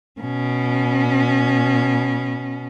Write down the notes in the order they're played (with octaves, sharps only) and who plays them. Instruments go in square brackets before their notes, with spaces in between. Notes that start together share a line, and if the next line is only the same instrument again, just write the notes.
[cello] B2 C#4